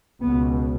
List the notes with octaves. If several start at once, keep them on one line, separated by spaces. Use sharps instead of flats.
C#2 B2 B3